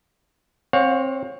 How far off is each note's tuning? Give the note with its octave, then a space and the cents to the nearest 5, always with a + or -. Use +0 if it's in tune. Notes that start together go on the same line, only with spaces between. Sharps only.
C4 +20 C#5 +0 F5 +45